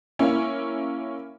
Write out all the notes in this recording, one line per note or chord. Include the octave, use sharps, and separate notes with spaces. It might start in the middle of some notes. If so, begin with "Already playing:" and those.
A#3 C#4 E4